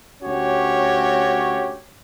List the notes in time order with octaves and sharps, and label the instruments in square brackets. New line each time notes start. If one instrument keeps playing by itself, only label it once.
[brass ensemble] D2 C#4 F#4 G4 C#5